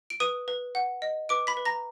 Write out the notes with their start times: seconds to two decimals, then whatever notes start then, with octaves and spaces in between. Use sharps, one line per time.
0.10 D7
0.20 B4 D#6 D#7
0.48 B4
0.75 F#5
1.02 D#5
1.29 B4 D6 D7
1.47 B5 B6
1.57 B4
1.65 A#5 A#6